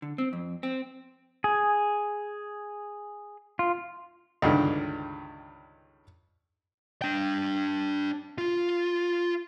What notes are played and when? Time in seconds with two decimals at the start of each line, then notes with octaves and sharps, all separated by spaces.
0.02 D3
0.18 C4
0.33 F2
0.63 C4
1.44 G#4
3.59 F4
4.42 C#2 G2 D3 D#3
7.02 D4 G5
8.38 F4